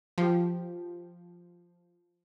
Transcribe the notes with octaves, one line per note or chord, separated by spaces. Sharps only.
F3 G4